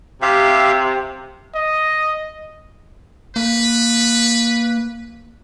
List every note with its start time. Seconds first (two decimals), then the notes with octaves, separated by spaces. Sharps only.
0.22 C3 G4 E5 F5
1.55 D#5
3.36 A#3 B4